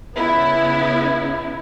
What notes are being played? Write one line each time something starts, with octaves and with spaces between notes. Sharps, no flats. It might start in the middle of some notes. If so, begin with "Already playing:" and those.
C#3 B3 E4